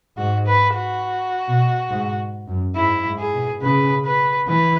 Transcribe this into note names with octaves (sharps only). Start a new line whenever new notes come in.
G#2 F#4
B4
F#4
B2
G#2
F#2
G#2 E4
G#2
G#4
B2
C#3 B4
B4
E3 B4